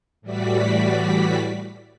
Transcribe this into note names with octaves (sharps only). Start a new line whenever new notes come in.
A2 E3 G3 F#4 D5 B6